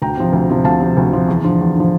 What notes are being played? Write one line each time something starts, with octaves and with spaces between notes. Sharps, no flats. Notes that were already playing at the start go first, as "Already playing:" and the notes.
D2 G5 A#5
C3 F3
D2
C3 F3
D2 F5 A5
C3 F3
D2
C3 F3
E2
D3 F3
E2
D3 F3